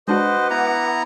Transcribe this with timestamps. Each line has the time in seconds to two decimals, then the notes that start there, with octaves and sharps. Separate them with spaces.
0.08 G#3 D4 F#4 B4 C5 D#5 F#5 D6
0.50 B3 E4 A#5